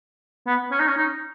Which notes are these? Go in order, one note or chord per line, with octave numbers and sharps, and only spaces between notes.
B3
C#4
D#4
C#4
D#4